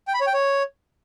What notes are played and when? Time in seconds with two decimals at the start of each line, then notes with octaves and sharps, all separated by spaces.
0.08 G5
0.14 B5
0.20 C#5
0.27 G5
0.33 C#5